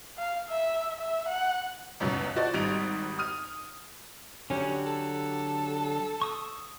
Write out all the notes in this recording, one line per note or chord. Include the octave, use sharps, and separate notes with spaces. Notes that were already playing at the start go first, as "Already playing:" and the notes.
F5
E5
E5
F#5
G1 C#2 F#2 B2 F#3
F4 F#4 A4 C5 D5 D#5
G#1 G#2 G3 D7 F7
D#6 F6 D#7
D3 F#3 C#4 G4
A4
C#6 D#6 E6